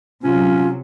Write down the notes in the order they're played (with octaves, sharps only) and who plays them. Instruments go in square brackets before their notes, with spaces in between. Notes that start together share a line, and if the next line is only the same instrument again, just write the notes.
[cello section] C3 F#3 [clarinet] C#4 [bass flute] F4